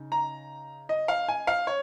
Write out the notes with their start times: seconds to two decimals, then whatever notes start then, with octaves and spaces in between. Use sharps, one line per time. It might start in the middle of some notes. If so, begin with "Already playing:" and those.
Already playing: C#3 D#4
0.12 A#5
0.89 D#5
1.08 F5
1.28 G#5
1.47 F5
1.67 C#5